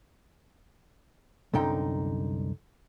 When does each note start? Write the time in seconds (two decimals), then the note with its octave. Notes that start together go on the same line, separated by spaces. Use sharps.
1.54 C2 F#2 D3 D#4 G5